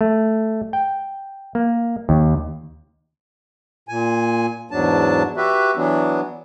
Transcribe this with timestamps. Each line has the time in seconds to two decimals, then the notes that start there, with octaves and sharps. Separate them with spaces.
0.01 A3
0.73 G5
1.55 A#3
2.09 D#2
3.89 A#2 G#5
4.71 E2 G#2 F#3 D4 A5
5.37 F#4 G4 B4 E5
5.76 E3 F#3 B3 D4